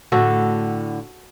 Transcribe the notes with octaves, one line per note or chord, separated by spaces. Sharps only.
A2 D3 F#4 A4